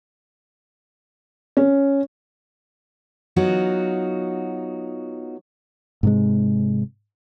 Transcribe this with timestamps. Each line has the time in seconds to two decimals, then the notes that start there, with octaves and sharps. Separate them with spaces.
1.57 C#4
3.36 F#3 B3 D#4 F4 F#4
6.03 G#2 C3 G#3